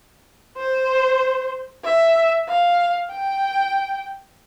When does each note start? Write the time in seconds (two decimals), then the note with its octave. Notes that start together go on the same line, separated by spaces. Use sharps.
0.57 C5
1.84 E5
2.48 F5
3.11 G5